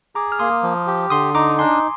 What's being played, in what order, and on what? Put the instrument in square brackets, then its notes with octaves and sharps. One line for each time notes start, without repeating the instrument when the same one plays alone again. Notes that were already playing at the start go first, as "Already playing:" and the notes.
[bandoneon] G#4 [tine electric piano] A#5 D6
[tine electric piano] F6
[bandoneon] A#3 [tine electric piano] C6 D#6
[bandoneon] F3
G4
[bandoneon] D3 [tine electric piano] C6 D#6
[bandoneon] D#4 [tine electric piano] A#5 D6
[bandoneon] D4 [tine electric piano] G#5 C6